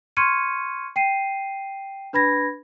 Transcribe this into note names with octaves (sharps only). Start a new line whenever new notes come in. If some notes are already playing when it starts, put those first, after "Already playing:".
C6 C#6 F6 G#6 C#7 D#7
G5 C7 D#7
D4 B4 B5 G#6 A#6